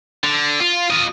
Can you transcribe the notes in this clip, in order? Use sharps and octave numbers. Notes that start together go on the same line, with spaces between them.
D3
F4
F4 D#5